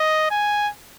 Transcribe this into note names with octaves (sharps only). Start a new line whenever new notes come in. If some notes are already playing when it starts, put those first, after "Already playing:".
Already playing: D#5
G#5